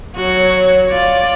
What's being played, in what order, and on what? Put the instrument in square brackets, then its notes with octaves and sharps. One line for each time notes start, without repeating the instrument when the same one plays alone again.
[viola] F#3 F#4 [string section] C#5
[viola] F4 D5